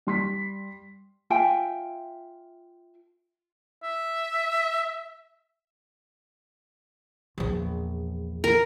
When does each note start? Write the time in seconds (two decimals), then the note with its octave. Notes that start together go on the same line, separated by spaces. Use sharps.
0.07 G3 C6 B6
1.30 F4 E5 G5 G#5
3.83 E5
7.38 A#1 E2
8.44 A#4